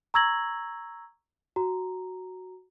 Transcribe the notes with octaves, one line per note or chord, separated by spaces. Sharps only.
A#5 C#6 E6 G#6 A#6 F#7
F#4 A#5